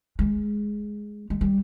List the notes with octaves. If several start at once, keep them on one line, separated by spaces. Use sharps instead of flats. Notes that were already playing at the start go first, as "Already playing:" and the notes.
G#3
G#3
G3